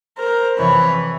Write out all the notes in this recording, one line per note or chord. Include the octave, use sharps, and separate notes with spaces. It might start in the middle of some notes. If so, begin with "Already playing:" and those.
A#4 C5
F2 C3 E3 B4 C#5